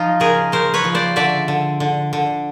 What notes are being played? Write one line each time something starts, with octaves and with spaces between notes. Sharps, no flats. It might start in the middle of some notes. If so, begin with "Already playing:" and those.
Already playing: F3 D#4 F4
C#3 G#4 A#4
C#3 A#4 C5
B4 C#5
F3
C5 D5
D3 D5 E5
D3
D3
D3